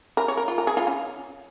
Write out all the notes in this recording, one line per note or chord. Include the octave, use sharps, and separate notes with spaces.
A#4
C#5
A#4
F4
A#4
G#4
F4
C#4